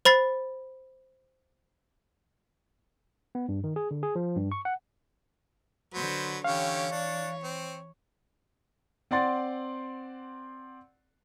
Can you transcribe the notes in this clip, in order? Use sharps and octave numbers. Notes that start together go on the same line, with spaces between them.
C5 B5 A6 C7
B3
G2
D#3
G#4
D3
G#4
F3
G2
C#6
F#5
D3 F#3 B4 C5
D3 E3 C#4 G4 C#5 F5
D4
C4
C4 D5 F#5 C6 A6